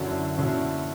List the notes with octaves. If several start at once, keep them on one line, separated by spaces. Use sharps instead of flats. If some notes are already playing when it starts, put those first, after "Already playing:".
Already playing: F#2 D3 F#3 C#4 E4
F#2 D3 F#3 C#4 E4